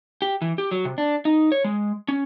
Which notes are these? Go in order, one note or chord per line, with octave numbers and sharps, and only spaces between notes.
G4
E3
G4
F#3
C3
D4
D#4
C#5
G#3
C#4